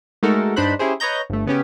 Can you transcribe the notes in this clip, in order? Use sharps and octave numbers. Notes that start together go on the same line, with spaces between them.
G#3 A3 D#4 F#4 A4 A#4
G2 D4 D#4 C5 B5 F#6
C#4 E4 G4 G#4 C5
B4 C#5 D#5 A#5 G6
G1 A3
C#3 B3 C#4 G4